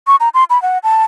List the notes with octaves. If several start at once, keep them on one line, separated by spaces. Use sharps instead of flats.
C#6
A#5
C6
B5
F#5
A5